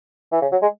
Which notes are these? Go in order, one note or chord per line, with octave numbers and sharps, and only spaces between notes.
E3
C#3
F#3
G#3